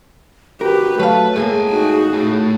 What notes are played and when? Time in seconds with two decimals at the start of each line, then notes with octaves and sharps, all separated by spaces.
0.61 F#4 G4 A#4 B4
0.99 F#3 A3 B4 F5 A5
1.36 A2 G#3 A#3 G#4 G5 G#5
1.71 D#4 F#4
2.13 A3 C#5